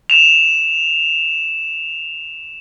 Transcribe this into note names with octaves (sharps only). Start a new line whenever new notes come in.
E7 F7